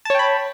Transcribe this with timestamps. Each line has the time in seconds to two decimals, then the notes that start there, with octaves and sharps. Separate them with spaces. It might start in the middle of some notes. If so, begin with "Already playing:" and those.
0.05 A5
0.10 C#5
0.15 G5
0.19 B5